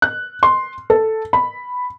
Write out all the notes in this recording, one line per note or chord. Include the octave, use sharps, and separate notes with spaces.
F#6
C6
A4
B5